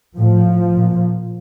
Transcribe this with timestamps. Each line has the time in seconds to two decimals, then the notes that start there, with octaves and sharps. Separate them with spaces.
0.17 A2 F3
0.75 A#2